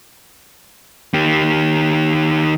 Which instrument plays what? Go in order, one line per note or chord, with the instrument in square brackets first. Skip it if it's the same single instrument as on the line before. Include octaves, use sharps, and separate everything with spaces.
[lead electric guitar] D#3 G4